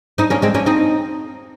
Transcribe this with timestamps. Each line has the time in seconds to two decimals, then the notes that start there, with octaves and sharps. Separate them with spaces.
0.18 C4 D#4
0.30 A#3 C#4
0.42 G#3 C4
0.54 A#3 C#4
0.66 C4 D#4